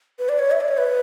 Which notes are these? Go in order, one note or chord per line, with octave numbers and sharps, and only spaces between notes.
B4
D5
C#5
E5
D5
C#5
B4